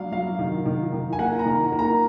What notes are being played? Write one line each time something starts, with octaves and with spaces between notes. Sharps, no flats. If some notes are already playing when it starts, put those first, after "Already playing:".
Already playing: F#3 D4 D5 F5
F#3 F5
D#3
D#3
D#3
G#5
A#3 F#5
A#5
D#3
A#3
A#5